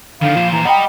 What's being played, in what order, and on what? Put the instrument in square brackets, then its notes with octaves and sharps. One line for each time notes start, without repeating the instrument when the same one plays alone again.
[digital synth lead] D3 [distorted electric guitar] D#3 F3 [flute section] F5 B5
[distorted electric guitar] A#2 C5 [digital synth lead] F3
[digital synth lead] E3 [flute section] A#5
[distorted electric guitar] G3 B5 [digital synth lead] D#5 [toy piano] F#5 G5